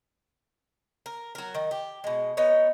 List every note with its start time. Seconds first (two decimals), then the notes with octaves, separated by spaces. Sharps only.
1.06 A#4
1.35 F#3 A#4
1.55 D#3
1.71 G4
2.04 B2 G#3
2.37 B3 D#4 C#5